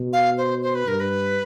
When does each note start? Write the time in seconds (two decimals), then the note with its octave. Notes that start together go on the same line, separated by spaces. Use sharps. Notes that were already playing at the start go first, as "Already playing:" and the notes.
Already playing: B2
0.13 F5
0.38 C5
0.62 C5
0.75 B4
0.87 G2 A#4
1.00 B4